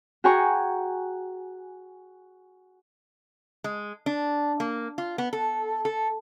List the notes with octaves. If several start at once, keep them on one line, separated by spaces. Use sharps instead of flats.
F#4 G#4 G5 G#5 A#5 C#6
G#3
D4
A#3
F4
B3
A4
A4